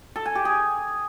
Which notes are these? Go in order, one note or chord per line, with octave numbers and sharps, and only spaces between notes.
A4
G#5
G4
G#4